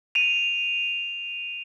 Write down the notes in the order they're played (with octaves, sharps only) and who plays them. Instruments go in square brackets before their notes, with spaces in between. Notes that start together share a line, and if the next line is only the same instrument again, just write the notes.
[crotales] D#7 F7